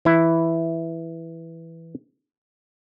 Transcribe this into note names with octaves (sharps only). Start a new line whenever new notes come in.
E3 E4